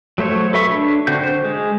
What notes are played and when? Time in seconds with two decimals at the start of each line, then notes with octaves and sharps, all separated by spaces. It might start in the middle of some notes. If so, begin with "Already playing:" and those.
0.18 F#3 A3 C5 C#5
0.53 A4 B4 E5 C#6
0.70 D4
1.07 D3 C4 F#4 G6
1.24 C5
1.44 G#3